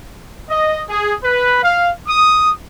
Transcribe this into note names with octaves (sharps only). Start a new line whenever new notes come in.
D#5
G#4
B4
F5
D#6